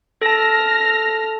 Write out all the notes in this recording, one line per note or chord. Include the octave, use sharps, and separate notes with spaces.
A4 A5 F6 A#6